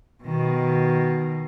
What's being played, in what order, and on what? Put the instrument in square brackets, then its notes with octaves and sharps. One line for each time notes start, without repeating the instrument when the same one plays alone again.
[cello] B2 D#3